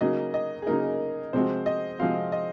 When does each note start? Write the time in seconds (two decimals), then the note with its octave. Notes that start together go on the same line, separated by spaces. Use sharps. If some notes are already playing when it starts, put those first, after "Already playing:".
0.01 C#3 F#3 A#3 D#4 D#5
0.34 D#5
0.62 G#4
0.67 C#3 F#3 A#3 D#4 A#4
1.33 C3 F3 G#3 C4 F#4 C5
1.66 D#5
1.99 C3 F3 G#3 C4 F#4 F5
2.32 D#5